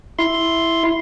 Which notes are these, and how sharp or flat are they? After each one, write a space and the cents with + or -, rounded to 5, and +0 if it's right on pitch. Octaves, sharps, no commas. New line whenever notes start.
E4 +0 C6 +0